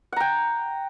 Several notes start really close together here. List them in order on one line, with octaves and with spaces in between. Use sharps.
F#5 A#5 G5